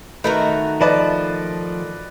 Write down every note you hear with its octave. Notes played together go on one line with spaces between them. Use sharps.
D#3 A3 D#4 F#4 A#4 B4
F3 B4 D5 D#5 A5